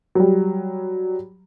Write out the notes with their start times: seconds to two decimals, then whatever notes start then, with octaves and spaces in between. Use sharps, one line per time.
0.15 F#3 G3